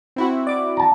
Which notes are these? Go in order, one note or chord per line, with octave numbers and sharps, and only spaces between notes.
C4 E4 F#4
D5 D6
A5 A#5